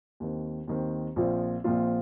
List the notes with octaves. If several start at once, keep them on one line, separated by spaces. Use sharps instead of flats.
D#2 D#3 C4
D#2 D#3 C4
A#1 A#2 F3 C4 F4
A#1 A#2 F3 C4 F4